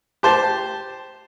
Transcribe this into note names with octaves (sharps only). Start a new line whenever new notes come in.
G4 C5 A5